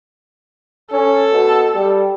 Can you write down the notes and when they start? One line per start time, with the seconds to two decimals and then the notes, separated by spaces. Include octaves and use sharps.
0.92 C#4 A4
1.33 B2
1.75 G3